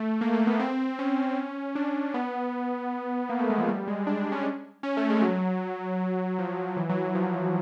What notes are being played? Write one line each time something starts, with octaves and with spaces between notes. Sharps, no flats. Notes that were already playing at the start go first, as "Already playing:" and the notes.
Already playing: A3
A#3
A3
B3
C4
C#4
D4
B3
A#3
A3
G#3
F3
G3
G#3
D4
C#4
C#4
A3
G#3
F#3
F3
E3
F#3
F3